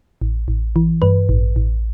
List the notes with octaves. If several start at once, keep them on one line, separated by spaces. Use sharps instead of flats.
A1
A1
E3
G2 B4
A1
A1